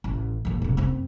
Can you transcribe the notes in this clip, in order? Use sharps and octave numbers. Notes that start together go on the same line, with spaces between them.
A1
D#2 A2
B1 C#3
F#2 C4